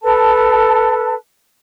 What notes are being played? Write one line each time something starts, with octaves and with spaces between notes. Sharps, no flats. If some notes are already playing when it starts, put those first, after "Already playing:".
A4 B4 A5